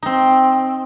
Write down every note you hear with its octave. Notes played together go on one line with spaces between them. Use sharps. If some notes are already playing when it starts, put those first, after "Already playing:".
C4 D#4